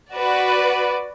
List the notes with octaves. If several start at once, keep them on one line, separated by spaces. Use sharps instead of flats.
F#4 B4 D5